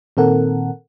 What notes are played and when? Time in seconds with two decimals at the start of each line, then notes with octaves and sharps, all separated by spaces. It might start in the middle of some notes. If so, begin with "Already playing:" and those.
0.17 A#2 D#3 C4 A4 A#4 F#5